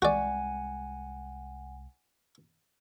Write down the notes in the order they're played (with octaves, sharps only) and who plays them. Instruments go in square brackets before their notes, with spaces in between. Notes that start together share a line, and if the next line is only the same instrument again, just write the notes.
[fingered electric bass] C2 G#3 [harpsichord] F#4 D5 [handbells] F#5 G#5